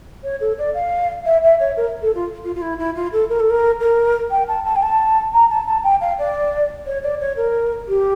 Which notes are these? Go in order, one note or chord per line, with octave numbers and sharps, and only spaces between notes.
C#5
A4
D5
F5
E5
E5
C#5
A#4
A4
F4
F4
F4
E4
E4
F4
A4
A#4
A4
A#4
A#4
G5
A5
A5
G5
A5
A#5
A5
A5
G5
F5
D5
C#5
D5
C#5
A#4
G4